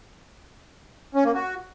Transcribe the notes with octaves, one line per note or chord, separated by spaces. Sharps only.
C#4
A#3
F#4